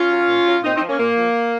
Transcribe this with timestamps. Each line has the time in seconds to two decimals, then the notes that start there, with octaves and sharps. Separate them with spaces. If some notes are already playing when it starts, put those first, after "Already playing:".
Already playing: C#4 F4
0.10 F#3
0.29 A#2
0.46 F#3
0.63 A#2 C4 D#4
0.76 C4 D#4
0.82 F3
0.88 A#3 C#4
0.99 A#2 A#3
1.17 F3